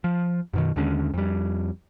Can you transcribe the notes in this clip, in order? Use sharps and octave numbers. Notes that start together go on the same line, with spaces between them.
F3
F#2 B2 D#3
D#2 D3 G#3 C#4
F2 G3